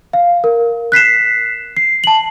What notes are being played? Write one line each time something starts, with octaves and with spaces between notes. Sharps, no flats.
F5
A#4
F#6 B6 C7 E7
C7
A5 F#7